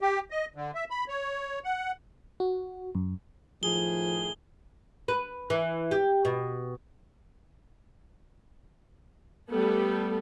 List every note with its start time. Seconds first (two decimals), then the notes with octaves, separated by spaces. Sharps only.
0.01 G4
0.31 D#5
0.55 D3
0.75 E5
0.90 B5
1.08 C#5
1.64 F#5
2.40 F#4
2.95 F#2
3.63 A2 D#3 F3 G#4 G7
5.08 B4
5.50 E3
5.91 G4
6.25 B2
9.50 G3 A3 B3 A4